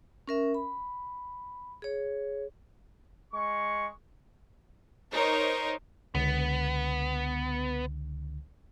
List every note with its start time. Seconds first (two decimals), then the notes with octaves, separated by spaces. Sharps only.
0.28 C#4 A#4 E5
0.55 B5
1.82 G#4 C#5
3.33 G#3 C#6
5.12 D#4 A#4 C5 C#5
6.15 C#2 D3 B3